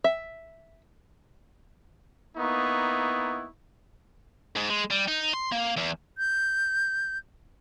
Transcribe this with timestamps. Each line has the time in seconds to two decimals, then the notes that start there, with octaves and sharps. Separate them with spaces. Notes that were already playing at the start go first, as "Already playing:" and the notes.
0.04 E5
2.37 A#3 B3 D#4 E4 C#6
4.56 G#2
4.70 G#3
4.91 G3
5.08 D#4
5.33 C6
5.52 A#3
5.77 E2
6.18 G6